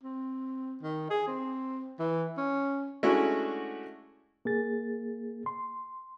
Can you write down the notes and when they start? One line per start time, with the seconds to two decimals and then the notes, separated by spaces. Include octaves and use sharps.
0.03 C4
0.82 D#3
1.10 G#4
1.27 C4
1.99 E3
2.37 C#4
3.03 G#3 A3 C#4 D4 E4 F#4
4.45 A#3 G#4 A6
5.46 C6